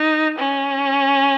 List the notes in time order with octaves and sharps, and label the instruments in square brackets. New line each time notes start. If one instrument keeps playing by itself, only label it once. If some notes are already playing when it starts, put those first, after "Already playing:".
Already playing: [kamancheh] D#4
C#4